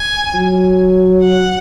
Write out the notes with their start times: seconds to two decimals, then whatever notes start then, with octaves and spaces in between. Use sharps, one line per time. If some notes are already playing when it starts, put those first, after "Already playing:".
Already playing: G#5
0.34 F#3
1.23 F#5